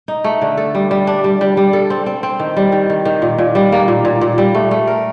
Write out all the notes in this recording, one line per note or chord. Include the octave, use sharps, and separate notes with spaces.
D#4
A3
D3
A4
G3
G3
D4
G3
G3
G3
A4
C4
C4
C4
D#3
G3
D#3
D#3
D#3
A#2
A#2
G3
A#3
A#2
A#2
A#2
G3
A3
A3
A#4